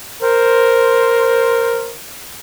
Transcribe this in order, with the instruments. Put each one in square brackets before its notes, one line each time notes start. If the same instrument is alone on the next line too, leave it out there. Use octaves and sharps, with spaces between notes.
[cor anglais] A#4 [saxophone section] C5